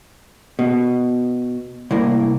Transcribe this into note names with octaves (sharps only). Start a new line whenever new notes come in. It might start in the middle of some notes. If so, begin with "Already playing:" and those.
B2
C2 A2 A#3